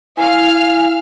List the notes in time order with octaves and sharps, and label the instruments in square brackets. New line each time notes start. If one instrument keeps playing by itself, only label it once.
[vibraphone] E4 [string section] F5 F6 [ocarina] G#5